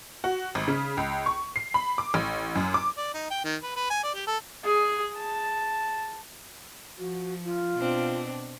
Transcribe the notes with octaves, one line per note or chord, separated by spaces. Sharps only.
F#4
G#1
C#3
C#2
C#6
C7
B5
D6
A1
F#2
D6
D5
D#4
G5
D#3
B4
B4
G#5
D5
G4
A4
G#4
A5
F3 F#4
F4
B2 C4 D4